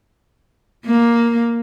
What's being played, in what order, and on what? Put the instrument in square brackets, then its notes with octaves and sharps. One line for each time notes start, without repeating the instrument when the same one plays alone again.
[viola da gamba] A#3